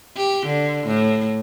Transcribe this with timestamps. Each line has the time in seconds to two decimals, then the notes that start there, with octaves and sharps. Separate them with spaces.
0.17 G4
0.46 D3
0.87 A2